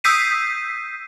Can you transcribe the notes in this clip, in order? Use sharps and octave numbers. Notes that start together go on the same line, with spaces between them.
D#6 E6 G6 B6 C7 D#7